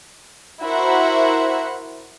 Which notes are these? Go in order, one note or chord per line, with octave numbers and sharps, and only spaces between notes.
E4 F#4 A#4 C5 E5 F#5